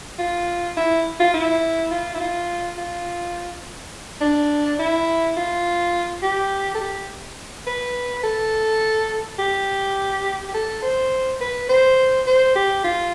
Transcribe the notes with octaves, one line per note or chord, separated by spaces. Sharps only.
F4
E4
F4
E4
F4
E4
F4
F4
D4
E4
F4
G4
A4
G4
B4
A4
G4
G4
A4
C5
B4
C5
C5
G4
F4